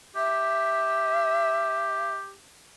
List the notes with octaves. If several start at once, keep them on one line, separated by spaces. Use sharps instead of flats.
G4 E5